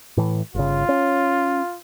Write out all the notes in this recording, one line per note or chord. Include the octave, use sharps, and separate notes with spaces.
A2 E3
G1 C#3 F4
C#4